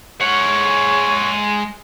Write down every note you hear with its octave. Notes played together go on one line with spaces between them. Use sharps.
G#3 C#5 F#5